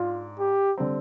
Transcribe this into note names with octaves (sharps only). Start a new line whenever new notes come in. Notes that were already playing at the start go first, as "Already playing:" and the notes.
Already playing: G#2 D4 F4
G4
D3 G3 C4